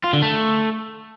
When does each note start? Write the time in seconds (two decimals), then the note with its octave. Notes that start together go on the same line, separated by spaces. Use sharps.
0.04 F4
0.13 D3
0.22 A3